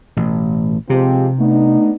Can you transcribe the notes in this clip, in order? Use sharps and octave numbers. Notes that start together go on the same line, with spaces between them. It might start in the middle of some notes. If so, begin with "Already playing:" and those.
A1 B2
C3 F3 G#3 C4 G4
A3 B3 D4 D#4